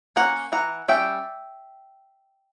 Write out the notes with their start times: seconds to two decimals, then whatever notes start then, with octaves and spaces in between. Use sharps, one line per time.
0.16 A#3 C#4 F#5 A#5
0.52 E3 F#5 A#5
0.88 G3 C#4 E5 G5